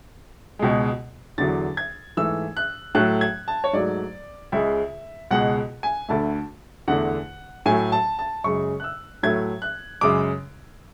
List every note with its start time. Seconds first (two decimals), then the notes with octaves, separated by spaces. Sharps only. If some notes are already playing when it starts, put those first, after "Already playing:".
0.59 C#2 B2 G#3
1.38 E2 D3 F#3 A6
1.77 G#6
2.17 G#2 E3 A3 E6
2.57 F#6
2.95 A2 F#3 A3 F#6
3.21 G#6
3.48 A5
3.64 C#5
3.73 G#2 F#3 A3 D5
4.52 C#2 C#3 G#3 E5
5.31 C#2 B2 G#3 F#5
5.83 G#5
6.09 D2 D3 A3 A5
6.88 E2 D3 A3 F#5
7.66 A2 F#3 A3 G#5
7.92 A5
8.19 A5
8.44 F#2 C#3 G#3 C#6
8.80 F#6
8.84 E6
9.23 A2 F#3 A3 G#6
9.62 F#6
10.01 F#2 C#3 G#3 D6